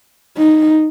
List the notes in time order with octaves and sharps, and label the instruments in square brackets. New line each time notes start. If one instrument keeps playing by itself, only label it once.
[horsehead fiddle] D#4